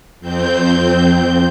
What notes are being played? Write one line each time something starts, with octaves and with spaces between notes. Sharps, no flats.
F2 C4 G6